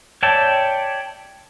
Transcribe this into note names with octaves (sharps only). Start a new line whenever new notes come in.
C#5 D5 E5 G5 A5